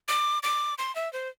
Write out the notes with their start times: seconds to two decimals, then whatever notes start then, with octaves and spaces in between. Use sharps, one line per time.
0.08 D6
0.43 D6
0.78 C6
0.95 E5
1.13 C5